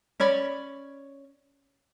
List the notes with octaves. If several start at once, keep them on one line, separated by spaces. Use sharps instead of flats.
C#4 C#5 D5 B5